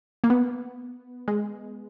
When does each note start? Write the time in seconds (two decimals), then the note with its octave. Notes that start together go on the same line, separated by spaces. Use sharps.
0.24 A#3
0.30 B3
1.28 G#3